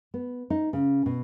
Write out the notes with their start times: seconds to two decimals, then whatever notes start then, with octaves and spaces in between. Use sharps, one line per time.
0.14 B3
0.50 D#4
0.73 C#3
1.06 B2